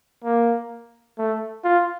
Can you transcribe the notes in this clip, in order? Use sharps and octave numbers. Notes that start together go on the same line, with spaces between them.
A#3
A3
F4